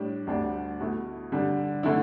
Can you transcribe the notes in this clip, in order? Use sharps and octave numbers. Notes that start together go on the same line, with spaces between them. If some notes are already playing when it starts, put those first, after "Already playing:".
Already playing: A2 G3 D4
D2 D3 G3 D4
B2 A3 E4
D3 G3 D4
D3 A3 E4